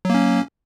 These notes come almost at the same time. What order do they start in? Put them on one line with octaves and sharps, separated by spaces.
F#3 A#3 C#4